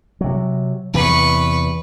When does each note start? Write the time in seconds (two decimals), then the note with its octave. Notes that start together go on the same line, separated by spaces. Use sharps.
0.21 C3 F#3
0.94 E2 C3 E3 B4 C#6